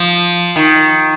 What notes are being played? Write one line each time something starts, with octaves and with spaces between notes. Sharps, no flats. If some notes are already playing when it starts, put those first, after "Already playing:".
Already playing: F3
D#3